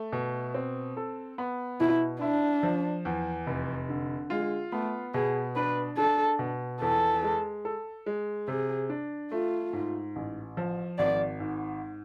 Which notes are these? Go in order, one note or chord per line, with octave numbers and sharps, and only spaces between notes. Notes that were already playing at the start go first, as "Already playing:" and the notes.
Already playing: A3
B2
C4
A4
B3
B2 E4
D4 E4
F3
E2
F1
D3
G#3 F4
A3 B3
B2 G#4
D4 B4
D4 A4
B2
E2 A4
G#3
A4
G#3
C3 G#4
D4
A3 F4
G#2
A1
F3
G#1 D5
G#2